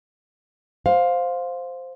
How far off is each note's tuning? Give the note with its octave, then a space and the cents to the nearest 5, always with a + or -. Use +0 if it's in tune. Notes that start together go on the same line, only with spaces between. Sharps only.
C5 +0 F5 +15